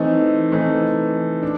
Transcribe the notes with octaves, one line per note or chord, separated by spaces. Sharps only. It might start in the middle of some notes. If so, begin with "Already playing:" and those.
Already playing: E3 A3 C4 D#4
E3 A3 C4 D#4
D4